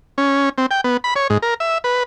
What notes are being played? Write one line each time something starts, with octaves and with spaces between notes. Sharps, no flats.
C#4
C4
G5
B3
B5
C#5
G#2
A#4
E5
B4